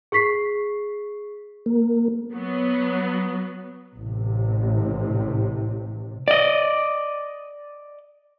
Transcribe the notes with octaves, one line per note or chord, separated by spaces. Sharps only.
G#4 C#6 B6 C7
A#3
F#3 B3
A1 C3
D5 D#5